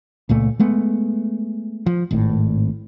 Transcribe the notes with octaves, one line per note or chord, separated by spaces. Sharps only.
C#2 A#2 A3
G#3 A3 B3
F3
G#1 A2